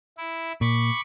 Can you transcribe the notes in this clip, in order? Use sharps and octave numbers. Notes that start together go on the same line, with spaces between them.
E4
A#2 B5 C#6 D6